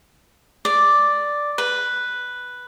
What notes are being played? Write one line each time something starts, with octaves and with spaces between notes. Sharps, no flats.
D5
B4